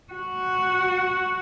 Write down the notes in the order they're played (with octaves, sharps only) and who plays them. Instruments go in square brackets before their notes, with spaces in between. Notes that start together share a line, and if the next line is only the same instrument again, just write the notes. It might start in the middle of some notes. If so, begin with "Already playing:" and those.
[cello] F#4